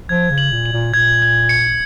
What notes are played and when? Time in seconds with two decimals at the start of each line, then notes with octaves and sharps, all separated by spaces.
0.09 F3 G#6
0.30 C#3
0.38 F#7
0.51 A#2
0.66 F#7
0.72 A#2
0.94 A#2 G#6
1.22 G#6
1.49 C#7